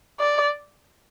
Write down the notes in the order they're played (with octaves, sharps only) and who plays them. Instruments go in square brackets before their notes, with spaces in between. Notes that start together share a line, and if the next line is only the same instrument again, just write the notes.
[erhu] D5